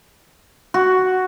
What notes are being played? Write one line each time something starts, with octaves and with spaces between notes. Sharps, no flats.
F#4